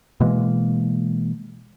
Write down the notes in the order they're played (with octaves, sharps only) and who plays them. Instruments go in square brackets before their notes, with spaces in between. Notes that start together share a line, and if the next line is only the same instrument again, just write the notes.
[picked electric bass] B2 E3 G#3 A#3